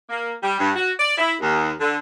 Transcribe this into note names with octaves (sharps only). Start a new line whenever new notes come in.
A#3
G3
G2
F#4
D5
E4
D#2
D3